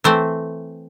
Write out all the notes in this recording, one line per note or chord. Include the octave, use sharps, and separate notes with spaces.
E3 A3 C4 C5